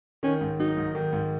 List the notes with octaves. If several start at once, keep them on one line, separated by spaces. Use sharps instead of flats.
D#3 C#4
G#2
F#3 D#4
G#2
D#3
G#2